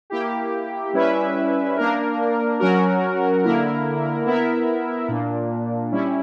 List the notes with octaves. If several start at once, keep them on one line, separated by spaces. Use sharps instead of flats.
A#3 E4 G4
G3 C#4 E4 B4 E5
A#3 D4 A#4
F#3 C#4 F#4 A#4
D3 A#3 E4 A#4
B3 E4 A#4 E5
A#2 A#3 D4
G3 C#4 E4